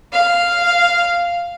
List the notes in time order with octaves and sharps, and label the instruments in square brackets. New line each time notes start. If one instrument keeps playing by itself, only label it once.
[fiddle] F5